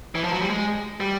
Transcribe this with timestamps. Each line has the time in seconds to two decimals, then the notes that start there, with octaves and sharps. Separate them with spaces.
0.15 E3
0.24 F3
0.33 F#3
0.42 G3
0.50 G#3
1.00 G3